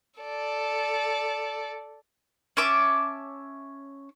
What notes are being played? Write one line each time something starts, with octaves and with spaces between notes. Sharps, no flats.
A4 D5
C#4 E5 A5 D6